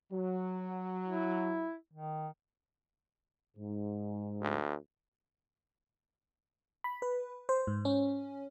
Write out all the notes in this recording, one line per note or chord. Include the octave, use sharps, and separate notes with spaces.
F#3
E4
D#3
G#2
D2
B5
B4
C5
G#2
C#4